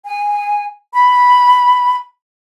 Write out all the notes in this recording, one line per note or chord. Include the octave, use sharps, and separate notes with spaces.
G#5
B5